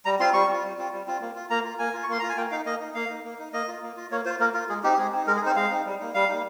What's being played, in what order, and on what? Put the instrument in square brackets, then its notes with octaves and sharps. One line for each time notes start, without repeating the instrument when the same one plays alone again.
[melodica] G3 A#5
C4 F4 C6
G3 C#6
C4 F4
G3
C4 F4
G3
C4 F4
A#3
F4
A#3 A#5
F4
A#3 G#5
F4
C#6
A#3 C6
F4 A#5
G#5
A#3 G5
D#4 F5
A#3 D#5
D#4
A#3 F5
D#4
A#3
D#4
A#3 D#5
F4
A#3
F4
A#3 C#5
F4 C5
A#3 A#4
F4 A#4
G#3 G#4
C4 D#4 G4
G4
G#3 G#4
C4 D#4
G#3 A#4
G#4
C4 D#4 C5
G#3 F5
C4 D#4
G3
A#3 D#4
G3 F5
A#3 D#4